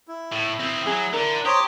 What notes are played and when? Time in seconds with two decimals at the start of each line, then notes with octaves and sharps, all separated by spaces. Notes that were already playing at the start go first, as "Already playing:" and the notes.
0.08 E4
0.32 A2
0.60 C4 G#4
0.87 F#3 G#4
1.13 D3 A#4
1.45 G4 C5 C#5 A#5 D#6